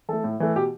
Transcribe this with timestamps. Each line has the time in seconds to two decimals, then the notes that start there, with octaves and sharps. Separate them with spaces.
0.09 E3 A3 A4
0.24 A2
0.40 E3 A3
0.55 B2 G4